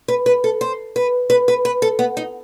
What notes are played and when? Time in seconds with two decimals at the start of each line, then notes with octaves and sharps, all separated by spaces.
0.08 B4
0.26 B4
0.44 A4
0.61 C5
0.96 B4
1.30 B4
1.48 B4
1.65 B4
1.82 A4
1.99 B3
2.17 D#4